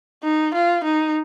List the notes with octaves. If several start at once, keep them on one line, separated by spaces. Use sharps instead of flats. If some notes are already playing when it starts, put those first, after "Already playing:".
D#4
F4
D#4